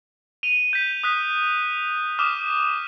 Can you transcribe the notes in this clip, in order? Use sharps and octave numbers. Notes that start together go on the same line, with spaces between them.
D#7 F7 G7
G6 B6
D#6 F#6 B6
D6 D#6 F6 F#6 B6 E7